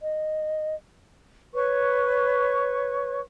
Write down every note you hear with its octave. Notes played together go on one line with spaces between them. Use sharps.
D#5
B4 C#5 C#6